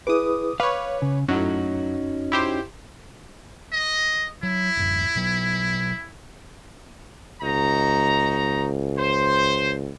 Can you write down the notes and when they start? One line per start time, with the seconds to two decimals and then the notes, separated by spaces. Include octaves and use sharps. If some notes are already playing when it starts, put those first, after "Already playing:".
0.07 E4 G#4 B4 D6 D#6
0.60 B4 C#5 F5 D6
1.02 C#3
1.28 F#2 A2 F#3 C#4 D#4 F#4
2.32 E4 G4 C5
3.72 D#5
4.43 F#3 E4
4.77 D1 F#2
5.16 B2 F#3
7.42 C#2 D#4 F#4 A#5
8.98 C5